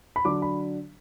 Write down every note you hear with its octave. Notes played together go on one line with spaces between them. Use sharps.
B5
D3 F#3 D4 D6
B5